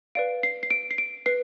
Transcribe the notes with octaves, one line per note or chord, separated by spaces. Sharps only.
B4 D5 F5 D7
C7
C7
D7
C7
D7
B4 C7